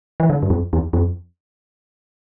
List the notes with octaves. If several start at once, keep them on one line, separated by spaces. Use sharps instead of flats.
E3
D3
G2
F2
E2
F2